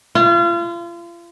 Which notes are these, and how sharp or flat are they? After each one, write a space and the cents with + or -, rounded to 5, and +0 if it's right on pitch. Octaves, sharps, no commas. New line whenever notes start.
F4 -35